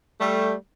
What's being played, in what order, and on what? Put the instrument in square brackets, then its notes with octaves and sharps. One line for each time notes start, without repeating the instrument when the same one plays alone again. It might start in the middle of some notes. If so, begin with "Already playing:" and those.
[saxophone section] G3 A3